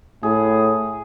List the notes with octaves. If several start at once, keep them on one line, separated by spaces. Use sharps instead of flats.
A2 G#4